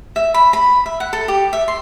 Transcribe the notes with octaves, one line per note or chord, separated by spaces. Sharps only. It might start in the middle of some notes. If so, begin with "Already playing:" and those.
E5
B5
B5
E5
F#5
A4
G4
E5
C6